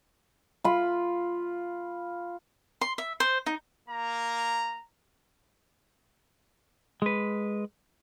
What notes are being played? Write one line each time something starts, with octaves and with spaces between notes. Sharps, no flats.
F4 B5
C6
E5
C5
D#4
A#3 A#5
G#3 B4